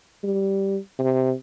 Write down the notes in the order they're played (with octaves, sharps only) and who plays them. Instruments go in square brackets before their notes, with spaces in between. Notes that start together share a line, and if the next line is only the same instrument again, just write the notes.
[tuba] G3
C3